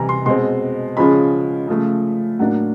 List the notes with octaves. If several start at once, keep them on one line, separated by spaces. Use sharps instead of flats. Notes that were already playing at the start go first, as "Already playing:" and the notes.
Already playing: C3 E3 G3 A#5
C6
B2 G#3 C4 C6
C#3 F3 G#3 C#4 B5
C#3 F3 A3
A2 F#3 A#3 D4 F#5